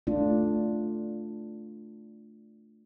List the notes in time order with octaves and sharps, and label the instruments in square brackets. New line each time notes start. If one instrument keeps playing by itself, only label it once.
[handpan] A3 D4 F4